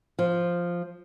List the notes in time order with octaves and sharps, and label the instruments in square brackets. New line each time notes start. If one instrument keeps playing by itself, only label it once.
[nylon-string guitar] F3